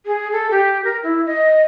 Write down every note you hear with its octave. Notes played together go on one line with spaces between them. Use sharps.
G#4
A4
G4
A#4
E4
D#5